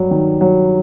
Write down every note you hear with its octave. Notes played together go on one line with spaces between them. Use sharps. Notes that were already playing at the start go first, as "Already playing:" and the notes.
Already playing: G2 F#3
D#3
F#3